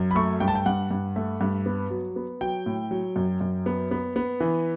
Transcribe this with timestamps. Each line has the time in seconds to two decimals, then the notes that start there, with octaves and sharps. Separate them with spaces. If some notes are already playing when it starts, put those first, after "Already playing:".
Already playing: F#2
0.11 B5
0.15 A3 C#6
0.40 G2 G5
0.48 A5
0.55 G5
0.66 G2 F#5
0.91 G2
1.16 A3
1.41 G2
1.66 B3
1.90 F#3
2.16 B3
2.41 F#3 G5
2.66 A2
2.91 F#3
3.16 F#2
3.41 F#2
3.66 B3
3.91 B3
4.16 B3
4.40 E3